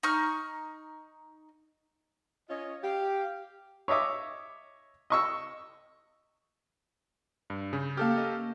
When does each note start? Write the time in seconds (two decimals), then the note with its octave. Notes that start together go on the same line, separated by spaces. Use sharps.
0.03 D#4 C#6 F6
2.49 C#4 F4 C#5 D#5
2.83 G4 F5
3.88 C#5 D#5 E5 D6 D#6
5.10 D#5 C#6 E6
7.50 G2
7.73 C#3 G6
7.97 A#3 G4 A4 F5 A5 F6
8.17 C#4 D#5